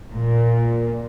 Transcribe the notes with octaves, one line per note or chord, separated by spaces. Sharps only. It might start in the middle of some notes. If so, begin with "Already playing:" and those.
A#2